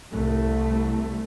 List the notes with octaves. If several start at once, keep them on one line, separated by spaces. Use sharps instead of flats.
C2 A3